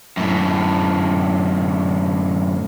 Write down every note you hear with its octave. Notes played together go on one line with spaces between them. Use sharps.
F#2 A2